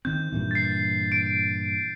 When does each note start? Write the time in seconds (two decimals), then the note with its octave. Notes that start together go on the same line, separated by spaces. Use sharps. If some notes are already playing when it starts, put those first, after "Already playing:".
0.05 D#3 C4 G6
0.33 G2 A#2 E3
0.51 A6 C7
1.12 D7